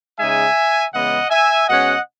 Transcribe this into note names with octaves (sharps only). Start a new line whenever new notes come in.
C#3 G#3 D#4 E5 G#5
C#3 E3 G#3 B3 D#5 F#5
E5 G#5
B2 G#3 C#4 D#5 F#5